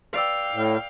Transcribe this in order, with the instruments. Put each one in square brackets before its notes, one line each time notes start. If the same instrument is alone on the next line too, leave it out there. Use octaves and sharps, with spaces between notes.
[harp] B4 D5 E6 [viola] F5 G5
[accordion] A2